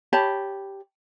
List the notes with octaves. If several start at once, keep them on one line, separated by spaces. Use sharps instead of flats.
G4 C#5 A5 B5